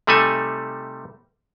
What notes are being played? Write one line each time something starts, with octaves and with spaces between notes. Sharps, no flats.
C3 G3 A3 D#4 A4 G#5